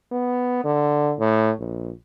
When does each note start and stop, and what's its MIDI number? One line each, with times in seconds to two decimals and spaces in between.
0.12 0.59 59
0.64 1.13 50
1.19 1.51 45
1.60 1.90 34